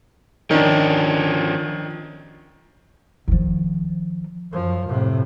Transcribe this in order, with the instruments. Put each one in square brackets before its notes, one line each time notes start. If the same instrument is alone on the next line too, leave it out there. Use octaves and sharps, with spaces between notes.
[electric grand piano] D#3 D4 [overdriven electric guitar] F3 C#4
[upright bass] D#3 F3
[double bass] F#2 F3
A2 C3